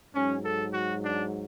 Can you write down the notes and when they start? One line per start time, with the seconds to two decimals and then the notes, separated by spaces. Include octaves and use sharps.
0.14 G#2 F#3 C#4
0.43 A4
0.73 F#4
1.02 D4